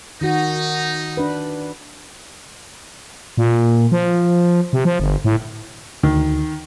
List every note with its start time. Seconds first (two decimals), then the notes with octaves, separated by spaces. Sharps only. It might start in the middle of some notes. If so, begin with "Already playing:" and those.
0.21 D#3 D#4 F#4
1.17 D4 B4
3.37 A#2
3.92 F3
4.73 C3
4.85 F3
5.00 G1
5.24 A2
6.03 D2 D#3